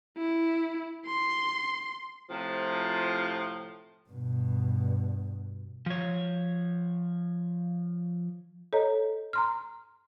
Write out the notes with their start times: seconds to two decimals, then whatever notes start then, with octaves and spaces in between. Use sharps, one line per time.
0.17 E4
1.06 C6
2.31 A2 C3 F3
4.10 G2 B2
5.86 F3 C#5
8.73 A4 C#5 D#5 A#5
9.33 A#5 C6 F6